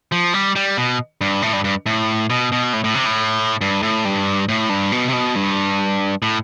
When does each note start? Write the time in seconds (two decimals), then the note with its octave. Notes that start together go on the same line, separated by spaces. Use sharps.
0.12 F3
0.34 G3
0.56 G3
0.77 B2
1.21 G2
1.42 A2
1.53 G2
1.64 G2
1.86 A2
2.30 B2
2.52 B2
2.73 A2
2.84 A2
2.95 C3
3.06 A2
3.61 G2
3.83 A2
4.05 G2
4.49 A2
4.69 G2
4.92 B2
5.08 C3
5.13 B2
5.36 G2
6.22 A2